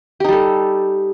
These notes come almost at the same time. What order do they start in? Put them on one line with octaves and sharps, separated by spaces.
G4 D#4 G3 A4